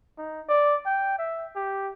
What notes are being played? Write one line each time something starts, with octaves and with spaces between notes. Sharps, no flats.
D#4
D5
G5
E5
G4